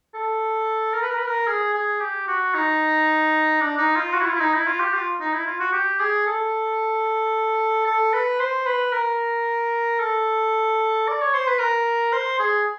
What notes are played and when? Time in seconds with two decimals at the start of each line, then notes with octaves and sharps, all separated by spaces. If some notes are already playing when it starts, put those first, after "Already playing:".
0.14 A4
0.93 A#4
1.02 B4
1.10 A#4
1.18 B4
1.26 A#4
1.47 G#4
1.74 G#4
2.00 G4
2.28 F#4
2.54 D#4
3.60 D4
3.78 D#4
3.96 F4
4.14 F#4
4.21 E4
4.27 F4
4.33 E4
4.40 D#4
4.54 E4
4.67 F4
4.80 G4
4.94 F4
5.20 D#4
5.33 E4
5.46 F4
5.60 F#4
5.73 G4
6.00 G#4
6.27 A4
7.86 A4
8.14 B4
8.40 C5
8.66 B4
8.93 A#4
9.99 A4
11.08 D5
11.21 C#5
11.34 C5
11.47 B4
11.60 A#4
12.13 C5
12.39 G#4